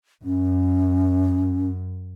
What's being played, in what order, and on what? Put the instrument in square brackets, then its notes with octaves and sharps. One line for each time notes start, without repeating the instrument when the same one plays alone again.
[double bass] F#2 [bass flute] C#4